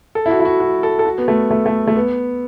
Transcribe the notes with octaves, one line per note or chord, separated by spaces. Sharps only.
A4
E4
F#4
E4
F#4
F#4
A4
A4
F#4
B3
A3
A3
A3
A3
B3